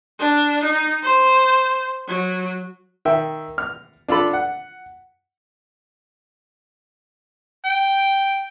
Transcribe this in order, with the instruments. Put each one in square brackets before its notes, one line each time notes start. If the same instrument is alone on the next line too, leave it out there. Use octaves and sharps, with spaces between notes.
[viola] D4
D#4
C5
F#3
[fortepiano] D#3 E5 G5
F6
D4 F4 A4 B5
F#5
[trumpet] G5